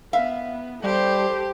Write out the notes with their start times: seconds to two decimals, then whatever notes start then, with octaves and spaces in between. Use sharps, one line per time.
0.13 B3 E5 F5
0.83 G3 G4 A4 C5